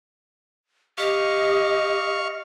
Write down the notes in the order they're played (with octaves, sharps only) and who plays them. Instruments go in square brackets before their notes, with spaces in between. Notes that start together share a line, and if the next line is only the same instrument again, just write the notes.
[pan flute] G4 [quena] D#5 [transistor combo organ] F5 C#6